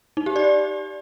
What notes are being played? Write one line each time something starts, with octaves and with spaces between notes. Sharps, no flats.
D#4
G4
D5